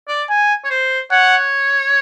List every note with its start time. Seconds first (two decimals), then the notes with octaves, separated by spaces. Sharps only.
0.08 D5
0.29 G#5
0.64 C#5
0.70 C5
1.11 C#5 F#5